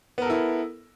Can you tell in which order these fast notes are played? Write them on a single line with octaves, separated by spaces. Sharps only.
B3 A#4 A4 E4